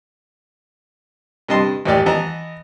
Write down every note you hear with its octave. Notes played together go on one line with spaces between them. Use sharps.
G2 C3 D#5 A5 C6
D#2 A2 E3 G4 D5
E3 B3 D#5 A5 A#5